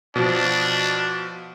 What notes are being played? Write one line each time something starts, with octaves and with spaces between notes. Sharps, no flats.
B2 F3 D4